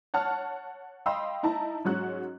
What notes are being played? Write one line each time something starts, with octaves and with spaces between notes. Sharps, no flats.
C#5 F#5 A5 F6
D#5 F5 G5 B5 C6 E6
D#4 E4 A5 A#5
G#2 F#3 C#4 F#4 F#6